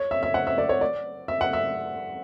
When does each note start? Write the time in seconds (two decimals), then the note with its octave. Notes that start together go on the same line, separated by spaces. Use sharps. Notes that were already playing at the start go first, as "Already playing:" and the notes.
Already playing: C#5
0.11 E5
0.23 E5
0.34 F#5
0.47 E5
0.58 D5
0.69 C#5
0.81 D5
1.28 E5
1.41 F#5
1.53 E5